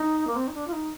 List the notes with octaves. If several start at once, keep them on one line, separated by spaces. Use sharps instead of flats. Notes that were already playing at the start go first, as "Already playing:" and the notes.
Already playing: D#4
A#3
C4
D#4
D4
F4
D#4